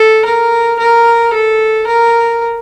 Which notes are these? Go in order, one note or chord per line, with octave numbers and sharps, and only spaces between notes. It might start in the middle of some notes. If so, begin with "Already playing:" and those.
Already playing: A4
A#4
A#4
A4
A#4